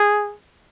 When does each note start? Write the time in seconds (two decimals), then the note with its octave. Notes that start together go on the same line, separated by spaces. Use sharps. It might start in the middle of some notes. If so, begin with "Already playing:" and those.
Already playing: G#4